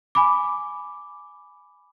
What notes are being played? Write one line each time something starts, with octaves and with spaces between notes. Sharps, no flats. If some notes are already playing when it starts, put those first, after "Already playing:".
G#5 B5 D6